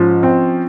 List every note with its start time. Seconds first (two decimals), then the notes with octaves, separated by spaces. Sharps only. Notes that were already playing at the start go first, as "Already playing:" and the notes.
Already playing: G#2 F3 C#4
0.23 C4